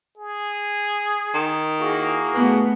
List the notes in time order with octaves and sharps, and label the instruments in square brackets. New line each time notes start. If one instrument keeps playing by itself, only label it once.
[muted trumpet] G#4
[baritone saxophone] D#3
[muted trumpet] A#3 [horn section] E4 F#4 G#4
[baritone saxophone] B2 [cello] A3 B3